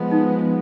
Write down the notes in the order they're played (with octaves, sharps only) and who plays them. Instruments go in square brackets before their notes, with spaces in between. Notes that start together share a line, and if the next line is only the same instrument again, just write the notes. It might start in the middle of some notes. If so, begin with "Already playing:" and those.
Already playing: [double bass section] F3 G#3 B3
[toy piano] D#4